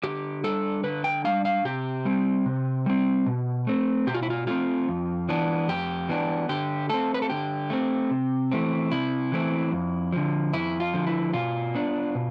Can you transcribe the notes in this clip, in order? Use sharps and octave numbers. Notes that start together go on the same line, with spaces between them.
D3 G4
G3 D4 A4
D3 B4
G5
G3 D4 F5
F5
C3 G4
G3 C4
C3
G3 C4
B2
A3 C4
B2 G4
F4
E4
F4
A3 C4 F4
F2
E3 B3 D4
F2 G4
E3 B3 D4
D3 G4
A3 C4 A4
B4
A4
D3 G4
A3 C4
C3
E3 A3 C4
C3 E4
E3 A3 C4
F2
D3 F3
F2 E4
F4
D3 F3
E4
B2 F4
B3 D4
B2